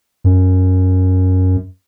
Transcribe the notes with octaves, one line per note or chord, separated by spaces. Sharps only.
F#2